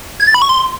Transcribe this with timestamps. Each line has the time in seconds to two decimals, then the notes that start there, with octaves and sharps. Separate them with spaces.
0.20 G#6
0.27 A6
0.34 B5
0.42 C#6
0.49 C6